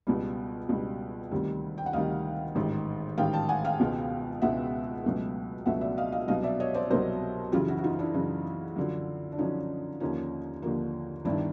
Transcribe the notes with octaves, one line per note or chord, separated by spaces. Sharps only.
C#2 B2 G3
C#2 B2 G3
D2 C3 D#3 G3
G5
F#5
D2 C3 D#3 G3 D#5 F5
A1 G#2 D#3
A1 G#2 D#3 F5 G5
G5 A5
F#5 G#5
F5 G5
C#2 B2 G#3
C#2 B2 G#3 E5 F#5
C#2 B2 F#3 A3
C#2 B2 F#3 A3 E5 F#5
D5 E5
D#5 F5
D#5 F5
C2 B2 F#3 D#5 F5
D5 E5
C#5 D#5
C5 D5
C2 B2 F#3 A#4 C5
F#2 C#3 E3 F4 G4
E4 F#4
F#4
D#4 F4
D4 E4
F#2 C#3 E3
F#2 D3 F3
D4
F#2 D3 F3 C#4 D#4
D#2 D3 F3 A#3 C#4 D#4
D#2 D3 F3 A#3
G1 G2 D#3 D4 E4